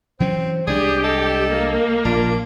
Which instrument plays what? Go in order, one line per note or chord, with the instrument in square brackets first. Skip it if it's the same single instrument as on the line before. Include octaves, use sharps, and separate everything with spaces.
[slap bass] E3 F#3 C#4 [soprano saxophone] C4 [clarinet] C5
[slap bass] C2 G#3 D4 [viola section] G4 [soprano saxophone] G#4 [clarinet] D5
[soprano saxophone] A4 [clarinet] D#5
[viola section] A#3
[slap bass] A#1 [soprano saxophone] D4 [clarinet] F4